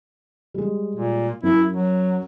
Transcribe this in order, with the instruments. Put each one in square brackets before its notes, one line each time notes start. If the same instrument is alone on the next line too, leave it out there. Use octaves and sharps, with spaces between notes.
[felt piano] G3 G#3
[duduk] A#2
[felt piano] F#2 [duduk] E4
[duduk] F#3